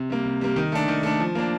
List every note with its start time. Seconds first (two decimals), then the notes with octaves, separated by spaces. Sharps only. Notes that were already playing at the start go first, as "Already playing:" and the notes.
Already playing: C3
0.10 G3 A#3
0.25 C3
0.41 G3 A#3
0.56 D#3
0.72 A3 D4
0.88 D#3
1.03 A3 D4
1.20 F3
1.35 A#3 D4